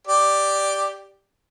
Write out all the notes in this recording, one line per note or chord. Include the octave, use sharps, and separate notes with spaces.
G4 D5